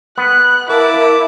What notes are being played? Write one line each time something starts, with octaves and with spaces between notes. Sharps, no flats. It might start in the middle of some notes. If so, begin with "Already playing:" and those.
B3 F#6
E4 A#4 F5 A5 D6